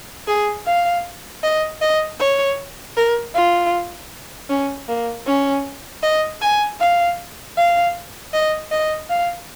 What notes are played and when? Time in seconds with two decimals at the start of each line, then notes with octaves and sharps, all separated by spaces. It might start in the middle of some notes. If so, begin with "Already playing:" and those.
0.27 G#4
0.66 F5
1.43 D#5
1.81 D#5
2.20 C#5
2.96 A#4
3.35 F4
4.49 C#4
4.89 A#3
5.27 C#4
6.03 D#5
6.42 G#5
6.80 F5
7.57 F5
8.33 D#5
8.72 D#5
9.10 F5